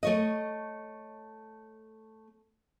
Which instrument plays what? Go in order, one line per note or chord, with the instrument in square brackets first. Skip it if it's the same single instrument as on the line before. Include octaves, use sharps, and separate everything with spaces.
[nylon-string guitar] A3 C#5 D#5